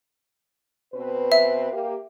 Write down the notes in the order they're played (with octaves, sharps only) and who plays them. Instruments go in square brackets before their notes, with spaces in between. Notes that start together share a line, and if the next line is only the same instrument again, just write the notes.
[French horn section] B2 C4 B4
[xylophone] E5
[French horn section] A#3 G4